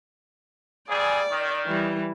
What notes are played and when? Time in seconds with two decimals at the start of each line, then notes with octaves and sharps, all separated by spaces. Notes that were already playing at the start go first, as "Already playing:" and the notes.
0.89 F2 G3 G#4 D5
1.30 D#3
1.66 E3 G3